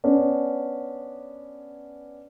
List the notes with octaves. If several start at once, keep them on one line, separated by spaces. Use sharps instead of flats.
B3 C#4 D4